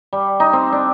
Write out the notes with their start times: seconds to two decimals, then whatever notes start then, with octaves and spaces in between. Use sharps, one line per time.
0.13 G3
0.40 D#4
0.53 C4
0.73 D4